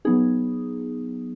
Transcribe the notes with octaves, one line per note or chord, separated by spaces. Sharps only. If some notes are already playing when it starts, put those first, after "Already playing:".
F#3 B3 D#4 G#4